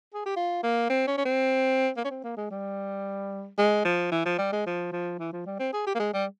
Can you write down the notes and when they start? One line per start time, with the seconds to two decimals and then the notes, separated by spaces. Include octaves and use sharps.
0.14 G#4
0.26 G4
0.36 F4
0.63 A#3
0.90 C4
1.07 C#4
1.18 C#4
1.25 C4
1.97 A#3
2.05 C#4
2.11 C4
2.24 A#3
2.37 G#3
2.51 G3
3.58 G#3
3.85 F3
4.12 E3
4.26 F3
4.39 G3
4.52 G#3
4.66 F3
4.92 F3
5.19 E3
5.32 F3
5.46 G3
5.60 C4
5.73 G#4
5.87 G4
5.95 A#3
5.99 G#3
6.13 G3